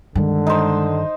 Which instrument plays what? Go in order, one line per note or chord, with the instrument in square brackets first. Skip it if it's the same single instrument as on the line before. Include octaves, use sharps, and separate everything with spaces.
[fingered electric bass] G2 D#3 [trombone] D3 [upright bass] G#3
[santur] D#4 C5